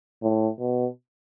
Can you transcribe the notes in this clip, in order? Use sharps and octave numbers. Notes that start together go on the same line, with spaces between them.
A2
B2